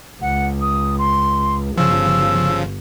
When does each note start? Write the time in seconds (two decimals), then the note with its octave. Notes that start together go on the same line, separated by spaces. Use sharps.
0.22 C#2 F#5
0.61 D#6
0.98 C6
1.78 G1 C#3 F3 E6